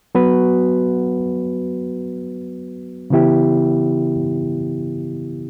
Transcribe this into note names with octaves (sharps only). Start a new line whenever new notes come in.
F#3 B3 F#4 B4
C#3 E3 B3 E4 G4